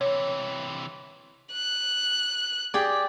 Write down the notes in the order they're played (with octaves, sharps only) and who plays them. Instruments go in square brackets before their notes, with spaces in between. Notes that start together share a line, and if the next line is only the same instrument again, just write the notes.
[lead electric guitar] C3 E3 [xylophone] C#5
[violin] F#6
[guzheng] G4 G#4 D5